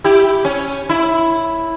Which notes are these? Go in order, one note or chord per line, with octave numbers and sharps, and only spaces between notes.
E4 G4
C#4
E4